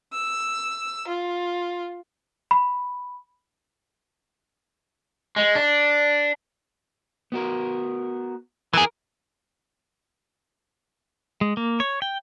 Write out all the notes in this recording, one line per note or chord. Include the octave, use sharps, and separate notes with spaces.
E6
F4
B5
G#3
D4
B3 F#4 A#4
E3 G#4 A#4
G#3
A#3
C#5
G5